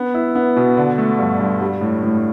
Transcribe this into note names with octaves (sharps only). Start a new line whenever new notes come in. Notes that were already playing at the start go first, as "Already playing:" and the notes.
Already playing: B3
E4
B3
B2
D3
A3
G2
G2
G3
A2
A2